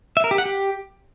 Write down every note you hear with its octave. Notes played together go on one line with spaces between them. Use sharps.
E5
A#4
G4
F#5
G4